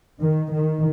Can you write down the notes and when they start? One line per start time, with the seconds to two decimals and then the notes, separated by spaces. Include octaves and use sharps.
0.21 D#3
0.52 D#3